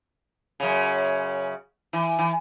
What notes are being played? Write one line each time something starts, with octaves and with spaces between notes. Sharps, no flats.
F#2 C#3
E3
E3